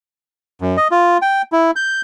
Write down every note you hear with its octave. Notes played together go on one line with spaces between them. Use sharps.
F#2
D#5
F4
G5
E4
G6